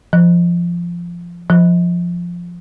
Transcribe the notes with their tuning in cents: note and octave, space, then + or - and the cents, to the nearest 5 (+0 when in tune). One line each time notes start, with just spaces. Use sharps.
F3 -15
F3 +0